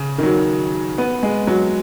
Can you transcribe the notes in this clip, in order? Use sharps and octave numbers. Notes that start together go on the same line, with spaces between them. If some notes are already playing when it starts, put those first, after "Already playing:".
Already playing: C#3
D#3
F#3
B3
G#3
F#3